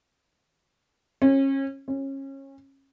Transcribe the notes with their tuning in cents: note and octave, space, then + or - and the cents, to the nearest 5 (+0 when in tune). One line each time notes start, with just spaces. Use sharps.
C#4 -30
C#4 -25